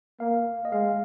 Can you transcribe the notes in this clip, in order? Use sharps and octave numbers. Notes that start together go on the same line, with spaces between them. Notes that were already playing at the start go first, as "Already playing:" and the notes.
A#3 F5
D#5
G#3 F5